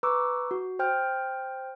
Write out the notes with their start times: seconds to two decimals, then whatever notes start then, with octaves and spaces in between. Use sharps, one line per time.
0.03 B4 A#5 C#6 D6 E6
0.51 F#4
0.79 C5 G5 F6 G6